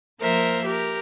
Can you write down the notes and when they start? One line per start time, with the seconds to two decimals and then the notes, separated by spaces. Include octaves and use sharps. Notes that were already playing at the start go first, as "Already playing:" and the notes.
0.20 F3 A#3 A#4 C5 E5
0.65 G4 A#4